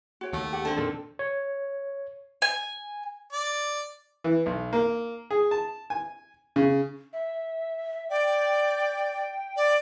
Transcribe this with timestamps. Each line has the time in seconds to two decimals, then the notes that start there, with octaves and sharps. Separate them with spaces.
0.21 F#4 C#5 G5
0.33 D#2 A3
0.53 G4 F#5
0.65 D3 C4 A5
0.77 F2 A#2 D#3 A4
1.19 C#5
2.42 G#5
3.33 D5
4.24 E3
4.46 B1
4.73 A#3
5.31 G#4
5.51 A5
5.90 G#5
6.56 C#3
7.13 E5
8.10 D5 G5
9.57 D5